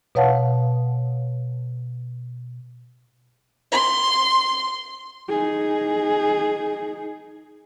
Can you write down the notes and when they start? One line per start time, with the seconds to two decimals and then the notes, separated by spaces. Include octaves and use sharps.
0.15 B2 B4 C#5 F5 F#5 A5
3.72 C6
5.29 D#4 G#4